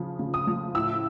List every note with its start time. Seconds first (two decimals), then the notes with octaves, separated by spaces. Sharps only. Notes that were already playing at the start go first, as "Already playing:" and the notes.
Already playing: C#3 F3
0.19 C#3
0.34 D#6
0.47 F3
0.75 A2 E6